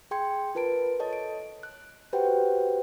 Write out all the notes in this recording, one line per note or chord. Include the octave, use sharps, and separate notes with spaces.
G#4 G5 C6 G#6 C#7
F4 A#4 B4 A5 D7
A4 C#5 D#5 A5
D7
F#6
F#4 G4 B4 C5 F#5 G5